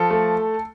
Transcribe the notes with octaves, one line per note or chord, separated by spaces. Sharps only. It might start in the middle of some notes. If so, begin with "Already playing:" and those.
Already playing: F3 A4
A3